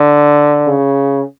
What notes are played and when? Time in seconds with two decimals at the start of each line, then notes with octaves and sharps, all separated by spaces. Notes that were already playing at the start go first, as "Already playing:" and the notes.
Already playing: D3
0.66 C#3